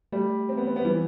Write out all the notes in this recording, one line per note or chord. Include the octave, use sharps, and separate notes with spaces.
G3 A3
C4
B3
C4
B3
E3 G3